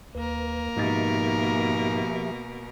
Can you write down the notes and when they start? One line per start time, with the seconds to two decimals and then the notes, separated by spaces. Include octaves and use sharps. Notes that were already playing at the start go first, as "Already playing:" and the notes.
0.15 D#2 A#3 A#4 B4
0.76 G#2 B2 F3 D#4 G4 E5 A6